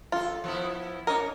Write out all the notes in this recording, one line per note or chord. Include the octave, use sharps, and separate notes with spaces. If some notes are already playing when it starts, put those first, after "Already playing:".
F#2 F4 A4
F3 B3 E4
C#4 A#4 C#5 D#5